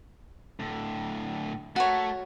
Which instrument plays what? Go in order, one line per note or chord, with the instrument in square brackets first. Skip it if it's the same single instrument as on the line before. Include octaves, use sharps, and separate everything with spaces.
[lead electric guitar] A2 D3
[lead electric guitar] A3 [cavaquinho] F#4 A#4 C#5